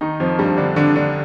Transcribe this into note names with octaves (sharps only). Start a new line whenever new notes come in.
D#3 D#4
F2 F3
G2 G3
D3 D4
D3 D4
D3 D4